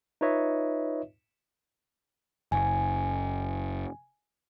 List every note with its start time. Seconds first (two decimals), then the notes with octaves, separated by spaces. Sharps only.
0.21 D#4 F4 B4 C#5 D#5 E5
2.52 F#1 G#5